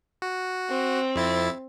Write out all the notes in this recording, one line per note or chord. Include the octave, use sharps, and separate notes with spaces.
F#4
C4
F2 E4 A6